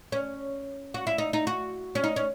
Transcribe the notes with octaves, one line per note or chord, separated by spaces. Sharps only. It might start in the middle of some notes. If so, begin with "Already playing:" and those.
C#4
F#4
E4
D#4
D#4
F#4
C#4
D#4
C#4